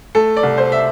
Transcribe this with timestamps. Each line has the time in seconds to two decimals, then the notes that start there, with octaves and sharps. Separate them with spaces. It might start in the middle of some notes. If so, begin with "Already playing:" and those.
0.15 A3 A4
0.37 D5
0.43 C2
0.58 C5
0.72 E5